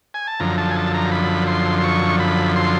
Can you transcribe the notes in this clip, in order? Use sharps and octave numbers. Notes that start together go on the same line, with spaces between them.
G#5
A5
F#2 D3 F3 A#5
A5
G#5
A5
A#5
B5
C6
C6
C#6
B5
C6